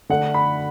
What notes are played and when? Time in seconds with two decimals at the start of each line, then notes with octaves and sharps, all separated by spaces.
0.09 D3 A3 D4 A4 F#5
0.34 B5